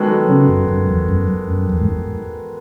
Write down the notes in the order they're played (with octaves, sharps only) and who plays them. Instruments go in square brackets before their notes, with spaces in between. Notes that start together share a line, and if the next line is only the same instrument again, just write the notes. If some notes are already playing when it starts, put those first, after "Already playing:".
Already playing: [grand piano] D#3 G#3 B3 F#4 A4
[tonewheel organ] F#3
C#3
F#2
F#2
E2
F#2
F#2
E2
G#2